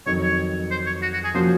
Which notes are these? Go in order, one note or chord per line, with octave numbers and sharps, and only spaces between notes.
F2 D#3 F#3 C#5
C#5
C5
C#5
F#4
F#4
G#4
F3 A#3 C#4 F#4 C5